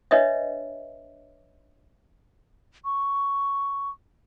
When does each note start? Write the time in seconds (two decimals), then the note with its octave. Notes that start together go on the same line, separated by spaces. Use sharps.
0.11 D4 B4 C#5 D#5 E5
2.85 C#6